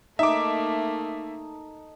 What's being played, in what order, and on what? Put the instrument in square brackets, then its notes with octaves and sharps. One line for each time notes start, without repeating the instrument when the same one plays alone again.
[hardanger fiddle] A3 A#3 [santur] D#4 A5 [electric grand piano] E5 D6